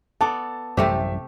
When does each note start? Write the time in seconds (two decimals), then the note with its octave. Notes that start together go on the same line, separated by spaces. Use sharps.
0.21 B3 A4 D5 A5
0.77 A1 F#2 C3 G3 A3 G4 C5 E5